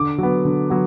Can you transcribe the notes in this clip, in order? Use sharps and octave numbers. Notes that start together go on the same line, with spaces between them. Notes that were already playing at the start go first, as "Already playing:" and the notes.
Already playing: D3 D6
F#3 B3
D3
F#3 B3